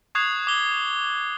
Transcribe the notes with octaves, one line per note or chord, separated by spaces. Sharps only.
C#6 D#6 F#6 G#6 C7 F7
D6 G7